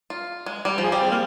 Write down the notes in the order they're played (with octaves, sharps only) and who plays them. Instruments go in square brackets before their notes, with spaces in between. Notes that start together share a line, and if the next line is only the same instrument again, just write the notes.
[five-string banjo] F4
G#3
G3
F3
[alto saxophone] G#4
[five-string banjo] G3 [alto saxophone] G4
[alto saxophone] C4
A#3